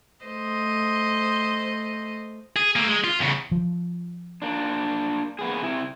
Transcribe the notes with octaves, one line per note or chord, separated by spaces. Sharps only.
A3 C5 D#5
G#4
A3 A#3
G#3
F4
E2 C#3
F3
A#3 D4
A#3 B3 G#4
C3 E4